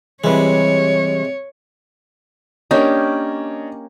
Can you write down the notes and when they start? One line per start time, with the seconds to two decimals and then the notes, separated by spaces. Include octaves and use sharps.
0.24 C3 E3 G3 G#3 B4 C#5
2.71 A#3 C#4 D4 G4 C#5 D#5